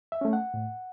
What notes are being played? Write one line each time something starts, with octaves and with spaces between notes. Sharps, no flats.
E5
A3 C#4
F#5
A2